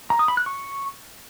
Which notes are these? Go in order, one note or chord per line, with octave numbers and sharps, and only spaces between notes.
A#5
D#6
B5
F#6
C#6